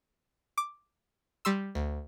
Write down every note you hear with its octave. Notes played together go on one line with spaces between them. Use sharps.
D6
G3 C6 E6
D2